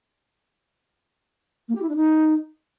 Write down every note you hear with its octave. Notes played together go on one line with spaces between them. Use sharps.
A#3
G4
E4
D4
D#4